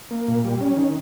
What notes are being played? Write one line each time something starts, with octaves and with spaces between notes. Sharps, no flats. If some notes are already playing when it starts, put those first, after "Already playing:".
A#3
A#2
G3
C#4
D#3